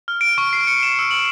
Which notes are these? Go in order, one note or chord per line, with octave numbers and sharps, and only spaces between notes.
F6
D7
C#6
C7
C#7
E7
E6
F#7